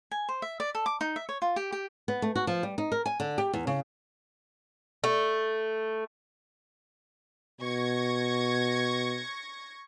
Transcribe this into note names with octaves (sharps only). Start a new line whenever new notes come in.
G#5
C5
E5
D5
A4
D6
D#4
E5
C#5
F4
G4
G4
B3
A3
F#4
F3
G3
D#4
A#4
G#5
D3
G4
E2
C#3
A3
B2 C#6 G#6 A#6